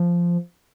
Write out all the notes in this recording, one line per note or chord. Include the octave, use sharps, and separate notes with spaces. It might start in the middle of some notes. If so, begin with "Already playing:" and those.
Already playing: F3